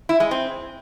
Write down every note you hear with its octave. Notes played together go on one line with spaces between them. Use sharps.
E4
G#3
C4